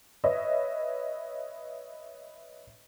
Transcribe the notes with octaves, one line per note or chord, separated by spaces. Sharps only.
B4 C#5 D#5 E5